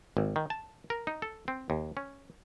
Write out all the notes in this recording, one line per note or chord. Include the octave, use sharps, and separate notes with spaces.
G#1
D#3
A5
A#4
D#4
A4
C4
D#2
C#4